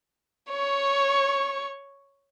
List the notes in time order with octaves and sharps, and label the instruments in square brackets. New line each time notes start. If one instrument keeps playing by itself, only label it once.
[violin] C#5 C#6